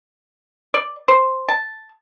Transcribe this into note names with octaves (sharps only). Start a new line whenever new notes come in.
D5
C5
A5